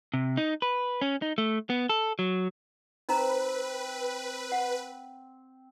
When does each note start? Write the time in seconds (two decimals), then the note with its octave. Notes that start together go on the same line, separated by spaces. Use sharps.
0.14 C3
0.37 D#4
0.62 B4
1.02 C#4
1.22 D#4
1.38 A3
1.70 B3
1.89 A4
2.19 F#3
3.09 C4 D#4 B4 A#5
4.52 F#5